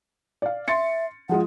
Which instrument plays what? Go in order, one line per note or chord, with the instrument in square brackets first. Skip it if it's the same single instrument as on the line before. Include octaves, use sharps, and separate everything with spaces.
[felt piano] D5 F5
[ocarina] E5 [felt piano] C6 A6 C#7
[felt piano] F3 G#3 F4 [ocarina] F#5